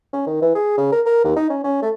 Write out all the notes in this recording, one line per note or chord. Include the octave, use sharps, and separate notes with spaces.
C#4
D#3
E3
G#4
C#3
A#4
A#4
D#2
D#4
C#4
C#4
A3